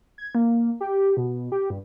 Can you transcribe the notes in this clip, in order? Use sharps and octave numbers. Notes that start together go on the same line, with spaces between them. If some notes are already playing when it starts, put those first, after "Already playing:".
G#6
A#3
G4
B2
G4
G2